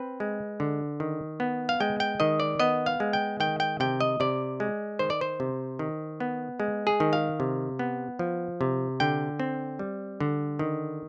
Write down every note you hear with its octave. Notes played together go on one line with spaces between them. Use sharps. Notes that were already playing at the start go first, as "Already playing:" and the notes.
Already playing: C4 B4
G#3
D3
D#3
B3
F5
G#3 G5
G5
D#3 D#5
D5
B3 D#5
F5
G#3
G5
D#3 G5
G5
C3 G5
D#5
C3 D5
G#3
D#3 C5
D5
C5
C3
D#3
B3
G#3
G#4
D#3
F5
C3
B3
F3
C3
D3 G5
C4
G3
D3
D#3